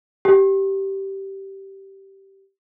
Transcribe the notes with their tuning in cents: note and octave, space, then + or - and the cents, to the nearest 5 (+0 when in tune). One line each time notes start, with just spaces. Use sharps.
G4 -15